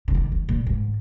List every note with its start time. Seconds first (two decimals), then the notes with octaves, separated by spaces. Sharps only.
0.08 D3
0.14 D#3
0.32 D#3
0.49 A#2
0.67 G#2